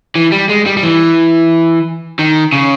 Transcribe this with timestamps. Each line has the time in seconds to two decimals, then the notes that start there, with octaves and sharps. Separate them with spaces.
0.15 E3
0.32 G3
0.49 G#3
0.66 G3
0.77 G3
0.83 E3
2.19 D#3
2.52 C#3